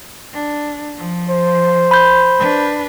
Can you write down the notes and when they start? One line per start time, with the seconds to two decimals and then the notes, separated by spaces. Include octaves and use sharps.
0.33 D4
0.97 F3
1.29 C5
1.91 B5 G6
2.38 D4 B4